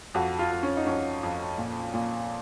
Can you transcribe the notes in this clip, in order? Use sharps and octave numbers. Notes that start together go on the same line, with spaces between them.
F2 F#4
F4
F2
C#4
D#4
F2 C#4
F2
A#2
A#2